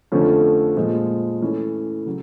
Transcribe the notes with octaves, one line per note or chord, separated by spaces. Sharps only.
F2 D3 F3 A3 C#4
A#2 F3 G#3
E3 A3 C#4
C#3 F#3